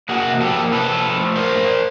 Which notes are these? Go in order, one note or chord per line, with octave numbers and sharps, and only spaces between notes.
A#3 F#4 G#4
C3
F3 G4 A4
A#3
C3 A4 B4
F3
F3
A3
F3 A#4 C5
G2